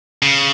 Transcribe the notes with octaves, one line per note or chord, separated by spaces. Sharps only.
C#3